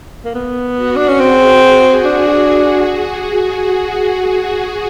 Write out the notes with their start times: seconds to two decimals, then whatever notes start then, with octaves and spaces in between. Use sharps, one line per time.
0.25 A#3
0.35 B3
0.77 F#4
0.96 D4
1.08 C#4
1.20 C4 G#4
2.05 D4